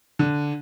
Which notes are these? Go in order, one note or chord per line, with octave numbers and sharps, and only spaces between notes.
D3